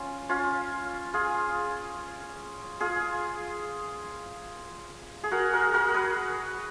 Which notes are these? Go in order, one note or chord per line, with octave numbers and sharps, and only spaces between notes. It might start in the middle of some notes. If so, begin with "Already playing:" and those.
Already playing: C#4 F4
C#4 F4
F4 G#4
F4 G#4
G#4
F#4 A#4
F#4 A#4
F#4 A#4
G#4 B4